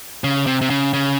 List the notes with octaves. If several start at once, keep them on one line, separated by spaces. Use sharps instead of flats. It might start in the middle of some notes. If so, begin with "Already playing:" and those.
C#3
C3
C3
C#3
C#3